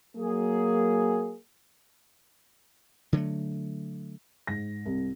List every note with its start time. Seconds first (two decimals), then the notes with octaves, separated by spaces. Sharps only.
0.16 F#3 A#3 G#4
3.13 D3 F#3 G3 A3
4.47 G#2 A#6
4.85 C2